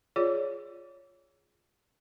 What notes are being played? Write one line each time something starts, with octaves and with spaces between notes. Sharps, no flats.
F4 G#4 C#5 D5